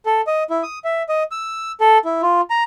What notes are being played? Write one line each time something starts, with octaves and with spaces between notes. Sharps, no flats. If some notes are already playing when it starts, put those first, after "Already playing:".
A4
D#5
E4
D#6
E5
D#5
E6
A4
E4
F4
A#5